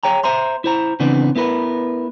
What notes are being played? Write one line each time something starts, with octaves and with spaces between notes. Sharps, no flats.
G#4 C#5 G5 A#5
C5 E5 A#5 C6
E4 C5 A#5
C#3 E3 B3 C4 D4
B3 E4 A#4 B4